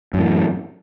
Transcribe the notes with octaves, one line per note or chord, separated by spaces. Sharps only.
F#2 A2 E3